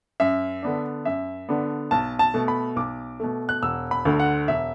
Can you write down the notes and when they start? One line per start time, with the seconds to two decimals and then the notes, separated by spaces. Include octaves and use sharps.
0.20 F#2 E5
0.63 D3 B3 D4
1.05 F#2 E5
1.49 D3 B3 D4
1.91 B1 A5
2.19 A5
2.34 B2 A3
2.48 B5
2.76 B1 D6
3.20 B2 A3
3.49 F#6
3.62 E1 E6
3.91 B5
4.05 D2 D3
4.20 F#5
4.48 E1 E5